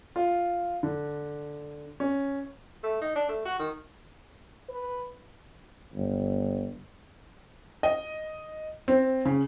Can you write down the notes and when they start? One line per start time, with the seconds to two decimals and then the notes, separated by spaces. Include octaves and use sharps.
0.16 F4
0.83 D3
2.00 C#4
2.84 A3
3.01 D#4
3.16 D4
3.29 A3
3.45 F#4
3.59 D#3
4.69 B4
5.94 G1
7.83 D#5
8.88 C4
9.25 C#3